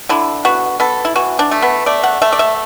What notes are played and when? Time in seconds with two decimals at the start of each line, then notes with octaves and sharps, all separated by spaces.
0.09 D3 E4
0.45 B3 F#4
0.80 B3 A4
1.05 E4
1.16 E3 F#4
1.39 D4
1.51 A3
1.62 B3
1.86 A3 D5
2.04 F#5
2.22 A3 E5
2.33 D5
2.39 E5